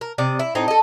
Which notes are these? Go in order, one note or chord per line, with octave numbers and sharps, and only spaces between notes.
A#4
C3 D5 D#5
E4
A2 C4 D#4
A4 D#5